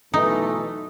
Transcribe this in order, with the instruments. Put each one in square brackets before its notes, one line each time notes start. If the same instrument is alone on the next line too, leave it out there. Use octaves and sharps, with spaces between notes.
[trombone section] B1 E3 A3 [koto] D#4